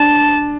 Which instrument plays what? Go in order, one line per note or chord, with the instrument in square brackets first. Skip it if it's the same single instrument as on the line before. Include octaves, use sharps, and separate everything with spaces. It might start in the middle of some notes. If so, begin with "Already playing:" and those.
Already playing: [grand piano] D4 [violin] A5